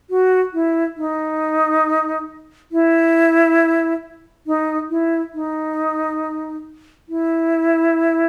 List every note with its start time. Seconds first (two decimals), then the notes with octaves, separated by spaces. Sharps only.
0.10 F#4
0.54 E4
0.97 D#4
2.72 E4
4.47 D#4
4.90 E4
5.34 D#4
7.09 E4